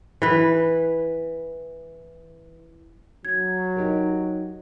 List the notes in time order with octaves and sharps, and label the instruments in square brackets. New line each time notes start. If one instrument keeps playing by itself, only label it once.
[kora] E3 B4
[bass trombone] F#3 [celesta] G#6
[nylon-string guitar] D#4 G4 A#4